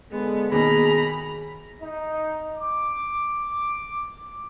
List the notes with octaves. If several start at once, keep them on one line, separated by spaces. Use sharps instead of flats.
D3 G#3 B3
D#2 B2 G#4 A#5 B5
D#4
D6